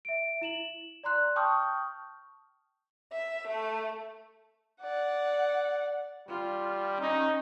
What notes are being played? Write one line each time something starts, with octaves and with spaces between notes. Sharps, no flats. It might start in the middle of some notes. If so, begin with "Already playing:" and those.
E5 D7
E4 E7 F#7
D5 A#5 C6 F#6
G5 A5 C#6 D#6 F6 G6
E5
A3
D5 F#5
G3 F4
C#4 D#4